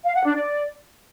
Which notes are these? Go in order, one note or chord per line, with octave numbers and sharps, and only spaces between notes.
F5
F#5
D4
D5